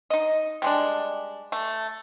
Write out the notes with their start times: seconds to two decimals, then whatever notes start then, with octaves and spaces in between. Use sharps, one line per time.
0.10 D#4 D#5
0.62 G3 G#3 D4
1.52 A3